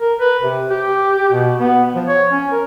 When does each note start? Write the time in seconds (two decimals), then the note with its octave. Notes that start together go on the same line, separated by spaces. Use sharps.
0.01 A#4
0.20 B4
0.42 C3
0.71 G4
1.32 B2
1.59 B3
1.95 F3
2.08 C#5
2.31 C#4
2.51 A#4